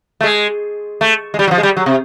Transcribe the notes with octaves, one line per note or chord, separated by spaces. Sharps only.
A3
G#3
A3
G#3
G3
F#3
F3
G#3
G3
F#3
C3